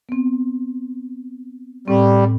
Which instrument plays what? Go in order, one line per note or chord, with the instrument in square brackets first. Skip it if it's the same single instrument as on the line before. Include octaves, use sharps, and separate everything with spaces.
[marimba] B3 C4
[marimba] A2 C4 [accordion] G3